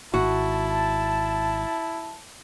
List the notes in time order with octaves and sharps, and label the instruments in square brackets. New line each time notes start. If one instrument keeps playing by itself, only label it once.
[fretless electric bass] G#1 [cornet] E4 [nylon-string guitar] F#4 [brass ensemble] A5